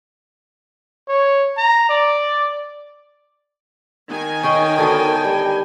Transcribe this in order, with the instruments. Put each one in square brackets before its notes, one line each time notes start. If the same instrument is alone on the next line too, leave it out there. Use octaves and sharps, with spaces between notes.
[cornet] C#5
A#5
D5
[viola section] D#3 G#5
[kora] C#4 G#4 D#5 [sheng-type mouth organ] G5
[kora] D3 F#3 B3 [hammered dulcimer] A5
[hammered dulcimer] G3